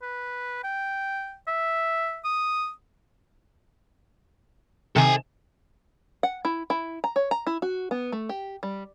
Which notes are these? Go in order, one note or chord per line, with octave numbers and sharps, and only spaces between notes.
B4
G5
E5
D#6
C3 D#3 A4 G#5
F#5
E4
E4
A#5
C#5
A#5
E4
F#4
B3
A3
G4
G3